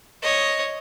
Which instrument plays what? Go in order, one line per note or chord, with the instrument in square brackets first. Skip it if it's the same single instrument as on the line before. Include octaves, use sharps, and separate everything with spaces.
[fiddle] C#5 D#5